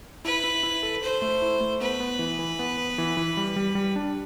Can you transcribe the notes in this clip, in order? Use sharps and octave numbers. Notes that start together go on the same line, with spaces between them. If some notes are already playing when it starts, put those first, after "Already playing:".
E4 B4
E4
E4
A4
A4 C5
A3
E4
A3
B3 B4
B3
E3
E3
B3
B3
E3
E3
G3
G3
G3
D4